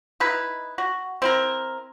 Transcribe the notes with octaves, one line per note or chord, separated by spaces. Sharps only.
D#4 E4 B4
F#4
C4 E4 A#4